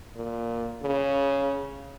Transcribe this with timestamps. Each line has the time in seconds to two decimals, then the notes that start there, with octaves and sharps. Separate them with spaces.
0.16 A#2
0.82 C#3